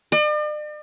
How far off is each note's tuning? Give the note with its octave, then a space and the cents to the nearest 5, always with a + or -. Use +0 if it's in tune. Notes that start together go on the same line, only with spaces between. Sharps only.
D5 +45